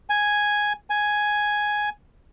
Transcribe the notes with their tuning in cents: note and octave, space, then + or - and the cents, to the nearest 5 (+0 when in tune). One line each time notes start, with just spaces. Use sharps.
G#5 +0
G#5 +5